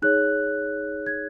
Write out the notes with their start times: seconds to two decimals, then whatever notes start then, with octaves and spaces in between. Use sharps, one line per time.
0.02 D#4 G#4 C#5 F#6
1.06 G#6